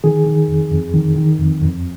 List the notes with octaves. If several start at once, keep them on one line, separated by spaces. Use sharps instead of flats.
D#3 G#4
D#3
F2
F2
D#3
D#3
F2
F2